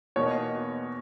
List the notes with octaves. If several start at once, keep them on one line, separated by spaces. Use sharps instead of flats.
E2 B2 A#3 D#4 C#5